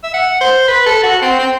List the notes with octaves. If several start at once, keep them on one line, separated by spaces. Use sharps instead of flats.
E5
F#5
C5
B4
A4
F#4
C4
C4